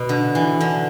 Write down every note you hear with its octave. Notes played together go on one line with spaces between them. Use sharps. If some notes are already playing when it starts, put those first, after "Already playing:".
Already playing: B2
D3
E3
D3